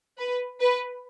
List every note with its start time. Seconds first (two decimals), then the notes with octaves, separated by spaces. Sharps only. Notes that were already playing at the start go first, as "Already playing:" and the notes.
0.18 B4
0.60 B4